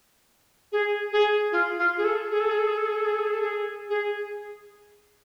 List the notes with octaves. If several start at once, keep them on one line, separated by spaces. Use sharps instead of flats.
G#4
G#4
F4
F4
G#4
A4
G#4
A4
G#4
A4
G#4
A4
G#4
A4
G#4
A4
G#4
A4
G#4
G#4